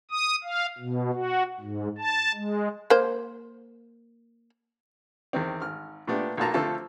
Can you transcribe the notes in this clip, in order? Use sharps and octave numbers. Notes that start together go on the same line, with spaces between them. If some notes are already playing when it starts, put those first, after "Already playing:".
D#6
F5
B2
F#4
G#2
A5
G#3
A#3 C5
E2 D#3 C4
G#1 F6
A#2 A3 B3 D4 G4
B1 A#2 F#3 A#3 A5 A#5
D3 F3 A3 C4 F4 A4